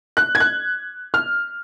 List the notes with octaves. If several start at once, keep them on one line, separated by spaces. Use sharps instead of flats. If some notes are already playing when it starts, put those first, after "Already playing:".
F#6
G#6
F#6
F6